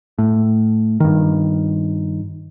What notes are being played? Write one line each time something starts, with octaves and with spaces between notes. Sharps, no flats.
A2
G2 D#3